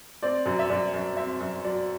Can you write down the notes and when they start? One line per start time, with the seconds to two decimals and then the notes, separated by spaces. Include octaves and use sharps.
0.23 C4 D5
0.46 F#2
0.59 E5
0.70 F#2 D5
0.94 F#2
1.17 C4 E5
1.40 F#2
1.64 F#3 D5